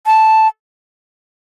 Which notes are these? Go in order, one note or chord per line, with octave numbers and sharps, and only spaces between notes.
A5